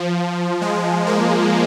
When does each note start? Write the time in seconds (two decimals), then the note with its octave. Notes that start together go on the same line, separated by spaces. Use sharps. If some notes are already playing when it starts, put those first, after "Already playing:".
Already playing: F3
0.61 G#3
1.07 A#3